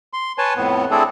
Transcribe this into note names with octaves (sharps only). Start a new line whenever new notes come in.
C6
B4 C#5 G#5 A5
F2 A2 B3
A3 C4 D4 E4 G#4 A4